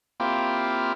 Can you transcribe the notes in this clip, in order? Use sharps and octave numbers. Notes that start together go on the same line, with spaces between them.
A#3 C4 E4 F4 G4